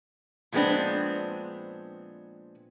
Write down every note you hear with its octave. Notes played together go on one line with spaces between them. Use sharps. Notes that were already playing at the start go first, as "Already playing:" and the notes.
A#2 F3 G#3 B3 C4 D4